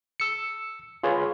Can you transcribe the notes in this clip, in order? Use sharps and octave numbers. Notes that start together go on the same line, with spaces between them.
E6 C#7
F4 G#4 B4 C#5